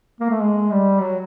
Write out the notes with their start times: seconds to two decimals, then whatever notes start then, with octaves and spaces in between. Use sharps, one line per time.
0.20 A#3
0.30 A3
0.40 G#3
0.71 G3
1.01 F#3